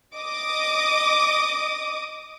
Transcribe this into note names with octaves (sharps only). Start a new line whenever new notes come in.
D#5 D6 D#6